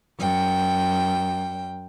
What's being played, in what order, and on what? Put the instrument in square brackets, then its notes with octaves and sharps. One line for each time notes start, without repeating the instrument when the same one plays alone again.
[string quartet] F#2 G5